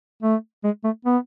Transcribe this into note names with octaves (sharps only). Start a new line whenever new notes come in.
A3
G#3
A3
B3